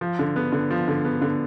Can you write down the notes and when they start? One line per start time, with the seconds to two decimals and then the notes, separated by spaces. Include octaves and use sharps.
0.01 F3
0.19 D3
0.36 B3
0.52 D3
0.70 F3
0.88 D3
1.05 B3
1.22 D3